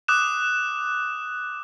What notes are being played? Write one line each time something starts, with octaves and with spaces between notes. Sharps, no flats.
D6 D#6 F#6 E7